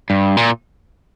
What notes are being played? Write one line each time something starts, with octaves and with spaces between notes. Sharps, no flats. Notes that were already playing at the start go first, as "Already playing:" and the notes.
G2
A#2